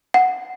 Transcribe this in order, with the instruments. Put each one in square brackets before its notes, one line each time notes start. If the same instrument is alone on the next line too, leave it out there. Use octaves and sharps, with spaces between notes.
[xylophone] F#5